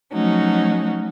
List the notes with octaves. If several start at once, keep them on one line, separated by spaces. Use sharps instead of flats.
F3 F#3 A3 C#4 D#4 F#4